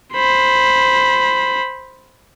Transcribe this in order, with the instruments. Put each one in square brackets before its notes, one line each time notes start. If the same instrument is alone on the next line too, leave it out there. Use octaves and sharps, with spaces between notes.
[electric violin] C5 B5